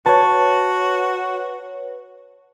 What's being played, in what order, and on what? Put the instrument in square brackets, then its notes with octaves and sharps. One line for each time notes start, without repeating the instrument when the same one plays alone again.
[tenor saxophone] F#4 [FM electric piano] B4 C#5 [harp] A5